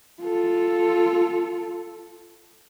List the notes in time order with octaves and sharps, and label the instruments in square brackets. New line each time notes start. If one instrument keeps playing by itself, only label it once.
[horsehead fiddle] F4 A4